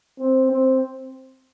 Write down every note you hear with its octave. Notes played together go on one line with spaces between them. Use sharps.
C4
C4